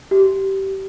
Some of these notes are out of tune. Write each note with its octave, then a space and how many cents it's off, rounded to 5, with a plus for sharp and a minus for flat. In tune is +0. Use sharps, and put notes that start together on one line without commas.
G4 -20